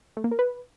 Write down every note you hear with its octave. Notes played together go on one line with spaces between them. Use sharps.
A3
A#3
A#4
B4